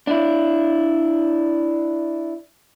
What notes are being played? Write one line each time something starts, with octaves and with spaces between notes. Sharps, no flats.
D4 E4